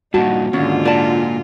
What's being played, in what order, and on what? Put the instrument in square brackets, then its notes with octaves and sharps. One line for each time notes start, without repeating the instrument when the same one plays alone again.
[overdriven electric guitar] G2 A#2 [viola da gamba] D#4 [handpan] F#4 [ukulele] A5
[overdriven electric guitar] D#2 [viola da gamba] G#2 D3 F4 [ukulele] C#4
[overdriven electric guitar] A#2 [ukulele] D5 A5